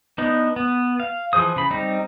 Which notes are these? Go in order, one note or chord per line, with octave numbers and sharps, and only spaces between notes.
B3 D4 D#4
B3
F5
E3 F3 G#4 C5 D#6
C#3 B5
G3 C4 D#4